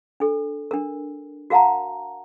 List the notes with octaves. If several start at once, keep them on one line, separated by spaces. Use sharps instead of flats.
D4 A4
D4 A#4
F#4 A#4 F5 F#5 A5 A#5